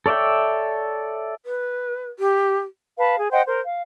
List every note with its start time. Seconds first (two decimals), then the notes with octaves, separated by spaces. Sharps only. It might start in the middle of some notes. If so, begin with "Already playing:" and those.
0.06 A4 C#5 D5 E5 G5
1.44 B4
2.19 G4
2.98 B4 F5 A5
3.19 G#4
3.31 C5 D#5 F#5 G5
3.46 A#4 C5
3.65 F5